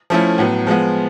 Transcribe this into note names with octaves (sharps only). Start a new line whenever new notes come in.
F3 A3 C#4 E4 A4
A2 F#3 B3
F3 G#3 B3